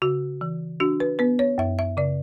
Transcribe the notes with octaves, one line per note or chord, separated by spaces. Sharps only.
C#3 F#4
E3
D4 F#4
B4
B3 B4
C#5
F#2 E5
E5
C#3 D5